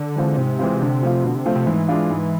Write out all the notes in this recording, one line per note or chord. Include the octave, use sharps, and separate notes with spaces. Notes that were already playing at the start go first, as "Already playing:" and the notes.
Already playing: D3
E3 G#3 C4 F4
G#2 C3
E3 G#3 C4 F4
D3
F3 A3 C4 F4
B2 D3
C3
F3 A3 C4 F4
C3
G#2 E3
G#3 D4 F4
G#2